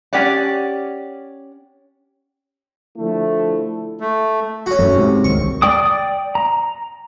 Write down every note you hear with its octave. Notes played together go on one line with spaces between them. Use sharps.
C#4 G4 D5 F#5
D3 F3 A3 E4
A3
C#4 F#4
A1 F#2 A3
G#2 C3
D2 G#2 D#3 C#6
C2
D5 G5 D6 D#6
A#5